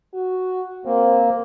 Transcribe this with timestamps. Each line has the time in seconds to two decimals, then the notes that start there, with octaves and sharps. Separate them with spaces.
0.14 F#4
0.85 A#3 C4